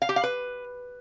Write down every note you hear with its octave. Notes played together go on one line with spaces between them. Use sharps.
F5
G4
F5
B4